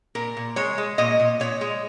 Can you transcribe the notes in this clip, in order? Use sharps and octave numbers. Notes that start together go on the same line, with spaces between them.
A#2 A#4
A#2
G#3 C#5
G#3
A#2 D#5
A#2
A#2 C#5
G#3